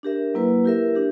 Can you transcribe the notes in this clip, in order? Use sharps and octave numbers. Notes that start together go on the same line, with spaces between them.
D4 G4 A#4 E5
F#3 A#3 E4 B4
E4 G4 A#4 E5
D4 G4